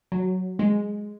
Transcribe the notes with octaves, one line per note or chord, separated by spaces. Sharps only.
F#3
G#3